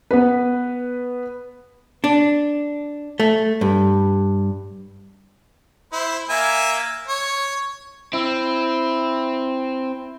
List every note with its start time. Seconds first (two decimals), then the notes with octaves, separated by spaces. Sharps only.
0.11 B3 B4
2.04 D4
3.20 A3
3.61 G2
5.93 E4 C5
6.30 A#3 E5 G#5
7.07 C#5
8.13 C4 E4